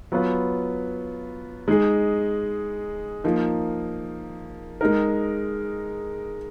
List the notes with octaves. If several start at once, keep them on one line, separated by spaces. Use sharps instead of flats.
F#3 B3 F4 B4
G#3 D#4 G#4
F3 A#3 D#4
G#3 D#4 A#4